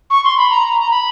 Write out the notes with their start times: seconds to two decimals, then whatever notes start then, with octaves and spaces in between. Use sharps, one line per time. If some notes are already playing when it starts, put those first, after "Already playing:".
0.10 C#6
0.24 C6
0.37 B5
0.50 A#5
0.79 A#5
0.90 B5